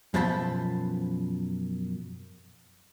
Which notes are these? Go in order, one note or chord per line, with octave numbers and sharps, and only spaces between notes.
F#2 B2 F3 C5 A5 B5